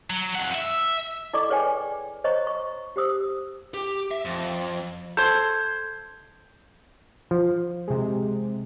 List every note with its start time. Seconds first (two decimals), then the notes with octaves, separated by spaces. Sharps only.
0.10 F#3
0.35 F2 F#5
0.54 E5
1.33 E4 A4 D5 D#5 C#6 D6
1.49 G#4 B4 C#5 D5 G5 G#5
2.24 C5 C#5 D#5 A#5 C#6
2.47 C#6
2.96 G4 C5 D#6 E6
3.74 G4
4.11 E5
4.25 F2
5.17 A4 C5 G6 G#6
7.31 F3
7.88 C3 G#3